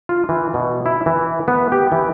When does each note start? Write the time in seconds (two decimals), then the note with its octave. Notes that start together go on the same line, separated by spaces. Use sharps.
0.09 F4
0.29 E3
0.54 B2
0.86 E4
1.06 E3
1.48 B3
1.72 G4
1.92 E3